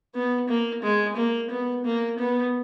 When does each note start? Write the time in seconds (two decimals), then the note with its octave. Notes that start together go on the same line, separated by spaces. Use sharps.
0.14 B3
0.48 A#3
0.83 G#3
1.16 A#3
1.50 B3
1.85 A#3
2.18 B3